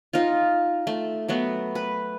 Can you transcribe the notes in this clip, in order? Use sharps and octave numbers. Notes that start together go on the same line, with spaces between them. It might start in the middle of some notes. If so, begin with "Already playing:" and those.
D#4 F4
A3
F#3 A3 B3
B4